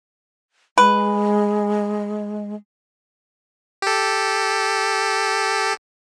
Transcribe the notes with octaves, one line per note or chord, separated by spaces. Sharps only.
G#3 B4
G4 A4